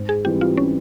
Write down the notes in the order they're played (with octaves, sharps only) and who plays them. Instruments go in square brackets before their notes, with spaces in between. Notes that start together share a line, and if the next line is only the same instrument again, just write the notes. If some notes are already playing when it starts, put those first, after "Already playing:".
Already playing: [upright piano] G#2
[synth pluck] G#4
[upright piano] E3 G3 C4 [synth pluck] G4
[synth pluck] F4
C#4